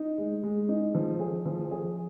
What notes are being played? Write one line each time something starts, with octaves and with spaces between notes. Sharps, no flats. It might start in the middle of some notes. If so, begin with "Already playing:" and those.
Already playing: D#4
G#3
G#3
D#4
F3
G#4
F3
G#4